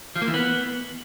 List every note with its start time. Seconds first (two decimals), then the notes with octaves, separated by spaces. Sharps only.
0.16 F3
0.22 A#3
0.28 E3
0.34 B3